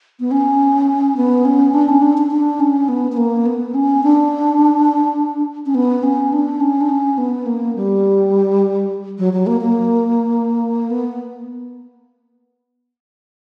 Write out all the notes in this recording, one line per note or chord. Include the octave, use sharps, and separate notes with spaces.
B3
C#4
B3
C#4
D4
C#4
D4
D4
D4
C#4
B3
B3
A#3
B3
C#4
D4
C#4
B3
C#4
D4
C#4
D4
C#4
B3
A#3
G3
F#3
F#3
A#3
A#3
B3